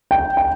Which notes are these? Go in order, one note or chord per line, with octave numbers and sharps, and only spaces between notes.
G5
G5